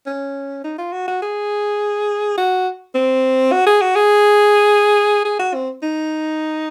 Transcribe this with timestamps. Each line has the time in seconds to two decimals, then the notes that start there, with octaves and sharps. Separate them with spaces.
0.07 C#4
0.64 D#4
0.78 F4
0.92 F#4
1.08 F#4
1.22 G#4
2.38 F#4
2.95 C4
3.52 F#4
3.67 G#4
3.82 F#4
3.96 G#4
5.25 G#4
5.39 F#4
5.55 C4
5.83 D#4